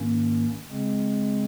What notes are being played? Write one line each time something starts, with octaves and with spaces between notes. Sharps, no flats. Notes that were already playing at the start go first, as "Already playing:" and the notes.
Already playing: G#2 D#3 A#3 C#4
C#3 G#3 C4